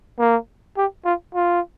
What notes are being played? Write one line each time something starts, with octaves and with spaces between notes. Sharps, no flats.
A#3
G4
F4
F4